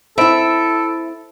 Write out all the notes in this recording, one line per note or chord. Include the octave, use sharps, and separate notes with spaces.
C4 E4 A4 E5 B5 D7